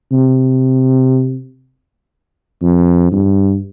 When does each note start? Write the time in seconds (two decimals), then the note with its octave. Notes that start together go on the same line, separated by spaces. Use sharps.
0.12 C3
2.62 F2
3.12 G2